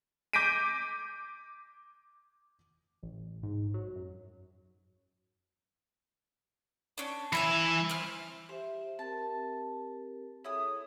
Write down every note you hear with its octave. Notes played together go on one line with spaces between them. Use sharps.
D6 G6 A#6 B6 D7 D#7
A1
G#2
F#3
F#2
C#4 D4
E3 E5 G#5 A5 B5
C4 F6
G4 C5 E5
C4 G4 A#4 A5
E4 G#4 A4 C#5 D#6